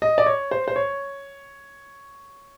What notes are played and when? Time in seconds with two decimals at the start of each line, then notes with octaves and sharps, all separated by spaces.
0.02 D#5
0.18 D5
0.26 C#5
0.51 C5
0.68 C5
0.76 C#5